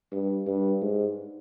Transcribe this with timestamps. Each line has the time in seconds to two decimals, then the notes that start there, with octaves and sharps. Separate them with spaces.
0.12 G2
0.47 G2
0.82 G#2